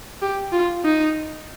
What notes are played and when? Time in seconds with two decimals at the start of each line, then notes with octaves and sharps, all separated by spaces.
0.22 G4
0.53 F4
0.85 D#4